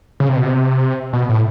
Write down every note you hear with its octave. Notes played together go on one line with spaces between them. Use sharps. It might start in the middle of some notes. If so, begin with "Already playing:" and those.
C#3
C3
B2
C3
B2
A2